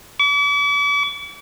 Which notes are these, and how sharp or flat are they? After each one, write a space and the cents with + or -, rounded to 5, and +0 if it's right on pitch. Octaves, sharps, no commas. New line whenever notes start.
D6 -45